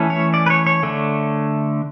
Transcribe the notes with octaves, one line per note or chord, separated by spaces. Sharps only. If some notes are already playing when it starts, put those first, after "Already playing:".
Already playing: E3 A3 C#4
C#5
D5
B4
C#5
C#5
D3 A3 D4